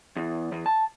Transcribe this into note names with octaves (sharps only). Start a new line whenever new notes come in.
E2
E2
A5